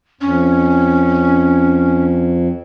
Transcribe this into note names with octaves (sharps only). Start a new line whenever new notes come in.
F2 C#4